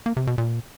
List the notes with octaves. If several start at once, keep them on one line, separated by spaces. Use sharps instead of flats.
A#3
C3
B2
A#2